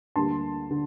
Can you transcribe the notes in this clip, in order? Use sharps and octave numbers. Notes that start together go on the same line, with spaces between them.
D2 D3 G3 A#3 A5 C6
D3